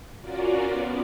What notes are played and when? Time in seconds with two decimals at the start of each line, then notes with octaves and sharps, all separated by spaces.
0.21 C#4 F4 F#4 A#4 D5
0.63 B3